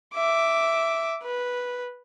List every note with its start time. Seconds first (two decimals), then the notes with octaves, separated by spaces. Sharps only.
0.14 E5 D6
1.23 B4